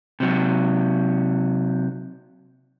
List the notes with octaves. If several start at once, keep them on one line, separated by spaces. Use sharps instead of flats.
C3 F#3